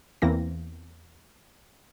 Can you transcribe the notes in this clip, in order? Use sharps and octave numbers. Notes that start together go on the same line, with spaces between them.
E2 E3 A#3 C4 A#6